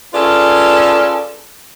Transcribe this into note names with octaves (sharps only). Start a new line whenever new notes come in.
C#4 F4 G#4 A4 B4 D5